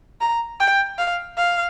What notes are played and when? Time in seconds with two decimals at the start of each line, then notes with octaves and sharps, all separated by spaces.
0.21 A#5
0.60 G5
0.98 F5
1.37 F5